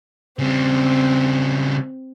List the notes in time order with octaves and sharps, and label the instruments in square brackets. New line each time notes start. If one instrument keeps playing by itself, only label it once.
[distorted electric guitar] C#3 G3 [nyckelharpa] C4